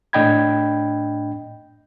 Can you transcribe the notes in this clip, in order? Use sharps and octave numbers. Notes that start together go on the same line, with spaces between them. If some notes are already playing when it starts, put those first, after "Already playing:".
A2 D4 D#5 G5 B5 G#6